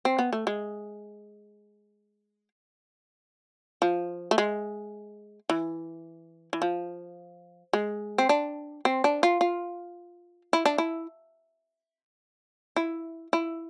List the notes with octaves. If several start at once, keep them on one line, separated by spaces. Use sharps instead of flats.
C4
B3
A3
G#3
F3
A3
G#3
E3
E3
F3
G#3
C4
D4
C4
D4
F4
F4
E4
D4
E4
E4
E4